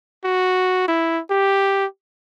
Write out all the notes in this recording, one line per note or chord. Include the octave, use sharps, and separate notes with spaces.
F#4
E4
G4